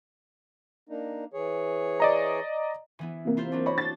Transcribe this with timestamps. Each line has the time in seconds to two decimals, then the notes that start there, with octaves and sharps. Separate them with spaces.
0.89 A#3 D4 D#4
1.34 E3 G#4 C#5
2.00 D5 D#5 A#5
2.99 E3 B3 E4
3.25 C3 A#3
3.37 E4 F4 C5
3.52 F#3 C4 D4
3.66 F#4 C#5 B5
3.78 C4 A5 A6